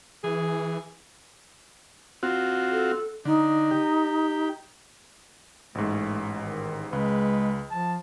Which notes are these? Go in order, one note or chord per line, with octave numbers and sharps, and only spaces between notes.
E3 G#4
C4 F4 F#4
A4
D3 D#4
G4
A1 G#2 A3
D#3
C#2 G#3 B4
F3 A5